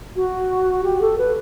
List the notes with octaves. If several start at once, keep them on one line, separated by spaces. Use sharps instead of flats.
F#4
G4
A4
B4